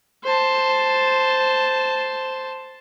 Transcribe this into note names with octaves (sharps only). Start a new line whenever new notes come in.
C5 A5